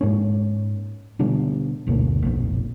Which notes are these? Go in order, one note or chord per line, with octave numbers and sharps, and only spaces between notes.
G#2 A#3 C#4
B2 D3 G3 B3
F#1 D2 B2 A#3
F1 B1 A#2